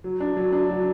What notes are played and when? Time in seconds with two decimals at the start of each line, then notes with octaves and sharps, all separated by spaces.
0.04 F#3
0.20 D4
0.37 F#3
0.53 D4
0.70 F#3